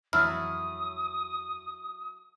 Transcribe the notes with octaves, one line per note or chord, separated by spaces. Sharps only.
F2 E3 F#3 A3 E4 D#6 F6